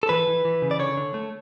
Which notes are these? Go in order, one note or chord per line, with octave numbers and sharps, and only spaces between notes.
A4
E3 B4
E3
E3
C#3
D5
D3 C#5
D3
A3